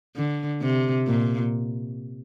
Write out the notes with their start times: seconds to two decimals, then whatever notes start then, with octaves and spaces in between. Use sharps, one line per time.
0.16 D3
0.61 C3
1.07 A#2